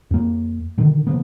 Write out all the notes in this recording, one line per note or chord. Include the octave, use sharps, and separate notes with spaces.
F2 A#3
A#2 D3 D#3
C#3 F3 A#3 B3